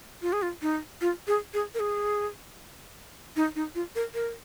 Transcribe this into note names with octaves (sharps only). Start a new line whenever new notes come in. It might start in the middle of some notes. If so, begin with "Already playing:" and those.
F4
G#4
F4
D#4
F4
G#4
G#4
A#4
G#4
D#4
D#4
F4
A#4
A#4